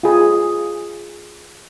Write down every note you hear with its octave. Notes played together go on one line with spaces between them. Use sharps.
F4 G#4